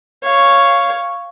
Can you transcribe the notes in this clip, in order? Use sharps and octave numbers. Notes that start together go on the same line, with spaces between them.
C#5 F5